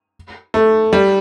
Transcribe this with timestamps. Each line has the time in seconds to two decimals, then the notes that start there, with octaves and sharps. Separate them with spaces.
0.54 A3
0.93 G3